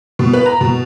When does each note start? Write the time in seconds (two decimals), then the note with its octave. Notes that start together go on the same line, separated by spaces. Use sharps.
0.19 B2
0.34 B4
0.46 A#5
0.61 B2